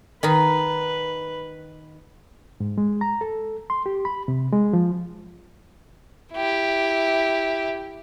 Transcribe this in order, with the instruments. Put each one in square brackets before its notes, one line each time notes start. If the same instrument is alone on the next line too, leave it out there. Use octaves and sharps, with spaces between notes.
[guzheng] D#3 D#4 [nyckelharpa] B4
[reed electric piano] G#2
G#3
A#5
A4
C6
G4
B5
C3
G#3
F3
[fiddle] E4 G4